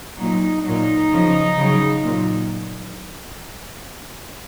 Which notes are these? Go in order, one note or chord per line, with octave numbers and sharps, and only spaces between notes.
A#2 F#3 D#4
A#2 F#3 D#4
C#3 F3
C#3 F#3
A#2 F#3